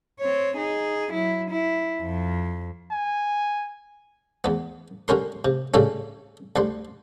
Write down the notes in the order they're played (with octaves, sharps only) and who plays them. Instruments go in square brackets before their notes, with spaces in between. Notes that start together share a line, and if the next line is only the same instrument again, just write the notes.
[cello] C4 C#5
D#4 G#4
F#3 E4
E4
F2 F3
[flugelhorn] G#5
[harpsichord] E2 B3
D3 G3 C#4 A#4 C6
C3
A2 C#3 G3 A3 C#4
D2 G3 C6